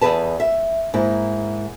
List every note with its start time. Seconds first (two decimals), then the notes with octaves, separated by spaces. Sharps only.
0.01 E2 G2 G#4 B4 A5
0.40 E5
0.94 G#2 A#3 E4